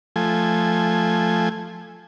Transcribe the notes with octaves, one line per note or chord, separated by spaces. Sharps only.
F3 A3 G#5